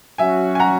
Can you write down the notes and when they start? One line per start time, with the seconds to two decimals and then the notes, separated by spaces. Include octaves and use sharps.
0.18 F#3 C#4 F#4 E5 G#5
0.55 G#5
0.59 F#5 A#5